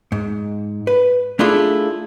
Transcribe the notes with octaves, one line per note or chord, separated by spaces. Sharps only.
G#2
B4
A3 D4 E4 F4 G#4 A4